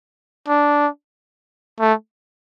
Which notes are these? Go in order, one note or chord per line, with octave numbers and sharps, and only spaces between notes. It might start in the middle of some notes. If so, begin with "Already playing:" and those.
D4
A3